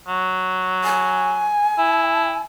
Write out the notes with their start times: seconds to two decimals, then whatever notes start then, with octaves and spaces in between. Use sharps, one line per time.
0.08 F#3
0.84 G#5
1.79 E4